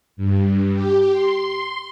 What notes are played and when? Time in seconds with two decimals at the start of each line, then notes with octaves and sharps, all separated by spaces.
0.17 G2
0.74 G4
1.12 C6